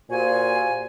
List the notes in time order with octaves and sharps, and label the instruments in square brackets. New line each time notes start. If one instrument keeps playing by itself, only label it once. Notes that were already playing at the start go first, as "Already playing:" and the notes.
[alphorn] A#2 [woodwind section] F#4 G4 G#5 [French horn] C5